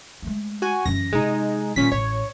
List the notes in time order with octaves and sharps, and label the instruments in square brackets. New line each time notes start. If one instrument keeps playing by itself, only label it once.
[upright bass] G#3 A3
[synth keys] F#4 G#5
[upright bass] F#2 E3 [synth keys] A#6
[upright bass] C3 [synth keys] G#3 D#4
[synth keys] A#2 C#4 B6 [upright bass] D#3 G3
[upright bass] A1 [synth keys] C#5